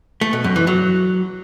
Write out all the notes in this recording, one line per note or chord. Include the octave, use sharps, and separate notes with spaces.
A3
B2
F#2
E3
F#3